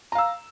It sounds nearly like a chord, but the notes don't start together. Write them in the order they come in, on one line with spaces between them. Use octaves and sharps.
A#5 F5 E6